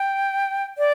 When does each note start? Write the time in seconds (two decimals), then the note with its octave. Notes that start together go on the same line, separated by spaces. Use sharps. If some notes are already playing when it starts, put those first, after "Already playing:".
Already playing: G5
0.78 D5